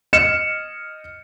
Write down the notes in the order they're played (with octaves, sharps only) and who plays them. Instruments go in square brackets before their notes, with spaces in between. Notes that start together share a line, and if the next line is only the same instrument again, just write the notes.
[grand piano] D#5 F6 C#7 E7